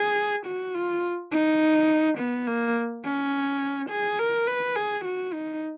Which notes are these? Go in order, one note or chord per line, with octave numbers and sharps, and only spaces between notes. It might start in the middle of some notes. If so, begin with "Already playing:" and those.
Already playing: G#4
F#4
F4
D#4
B3
A#3
C#4
G#4
A#4
B4
G#4
F#4
D#4